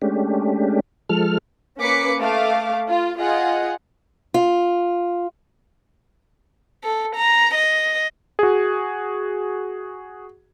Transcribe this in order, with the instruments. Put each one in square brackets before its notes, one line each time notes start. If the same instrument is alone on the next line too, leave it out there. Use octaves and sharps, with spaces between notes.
[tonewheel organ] G#3 A3 C#4 D4 G4
F3 G#3 A4 F6
[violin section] A#3 C#4 B4 D6 B6 C#7
A3 F5 D6
F4
F4 G#4 D#5 F#5
[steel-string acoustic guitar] F4
[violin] A4
A#5
D#5
[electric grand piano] F#4 G#4